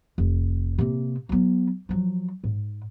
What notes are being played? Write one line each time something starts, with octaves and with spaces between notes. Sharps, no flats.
F1
C3 A#3
F#3 B3
F3 F#3
G#2